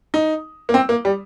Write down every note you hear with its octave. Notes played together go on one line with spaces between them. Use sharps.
D#4
A#3
C4
A#3
G3